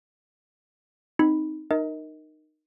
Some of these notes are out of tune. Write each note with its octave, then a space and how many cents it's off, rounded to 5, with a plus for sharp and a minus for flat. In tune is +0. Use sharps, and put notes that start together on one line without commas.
C4 +0 D#4 +0 B5 +0
D#4 -20 A#4 +0 D#5 +30